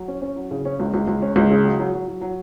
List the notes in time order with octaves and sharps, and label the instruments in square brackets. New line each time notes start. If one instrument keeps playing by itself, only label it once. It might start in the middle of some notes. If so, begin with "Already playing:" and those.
Already playing: [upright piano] F#3
C#4
C#4
F#3
C#3
C#4
C#2
C#2
C#2
C#4
C#2
C#3
F#3
F#3
F#3
F#3
F#3